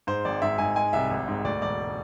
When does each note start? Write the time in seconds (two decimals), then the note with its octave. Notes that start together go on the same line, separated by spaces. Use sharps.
0.07 G#2 C5
0.25 G#1 D5
0.42 G#2 E5
0.58 G#2 G#5
0.76 G#3 G#5
0.93 C2 E5
1.11 G#1
1.28 G#2
1.44 D2 D5
1.62 E1 D5